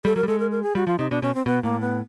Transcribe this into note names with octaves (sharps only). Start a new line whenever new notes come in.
G3 A4
F#3 A#4
G3
G#3 A4
A#4
A#4
G#4
G3 F#4
F3 F4
C3 D#4
B2 D4
B2 C#4
C4
B2 B3
A2 A#3
B3